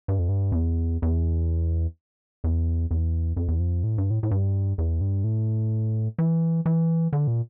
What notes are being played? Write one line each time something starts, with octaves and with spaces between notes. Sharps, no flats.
G2
F2
G2
F2
E2
E2
E2
E2
F2
E2
F2
A2
G2
A2
A2
G2
E2
G2
A2
E3
E3
D3
A#2